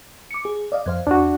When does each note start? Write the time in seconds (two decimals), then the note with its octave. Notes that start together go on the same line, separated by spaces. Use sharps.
0.31 D6 C#7
0.45 G#4
0.72 D5 D#5 F5
0.86 F2 C5 F5
1.07 E2 D4 F#4